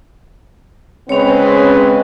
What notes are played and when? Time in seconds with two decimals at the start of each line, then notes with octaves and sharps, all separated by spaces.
1.09 C#3 G#3 C4 C#4 B4 C#5